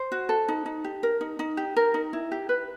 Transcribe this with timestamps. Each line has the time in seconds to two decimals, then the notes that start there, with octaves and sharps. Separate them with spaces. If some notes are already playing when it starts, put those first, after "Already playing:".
Already playing: C5
0.12 F#4
0.29 A4
0.48 D#4
0.66 D#4
0.84 G4
1.03 A#4
1.21 D#4
1.39 D#4
1.57 G4
1.76 A#4
1.94 D#4
2.13 E4
2.32 G4
2.49 B4